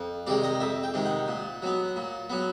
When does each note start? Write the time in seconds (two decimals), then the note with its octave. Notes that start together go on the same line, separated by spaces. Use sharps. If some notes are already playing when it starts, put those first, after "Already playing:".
Already playing: F2
0.27 C3 D#3 G#3 D5
0.44 D#5
0.60 F2 E5
0.83 G5
0.94 C3 D#3 G#3
1.06 F#5
1.28 A#2
1.62 F#3 B3
1.96 A#2
2.30 F#3 B3